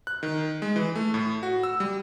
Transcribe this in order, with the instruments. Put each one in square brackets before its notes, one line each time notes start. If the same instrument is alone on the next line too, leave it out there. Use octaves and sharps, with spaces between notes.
[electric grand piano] F#6
D#3
G#3
E3
A3
A2
F#4
E6
G3